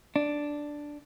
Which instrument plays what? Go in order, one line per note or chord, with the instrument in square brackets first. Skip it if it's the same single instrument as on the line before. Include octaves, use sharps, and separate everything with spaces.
[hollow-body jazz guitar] D4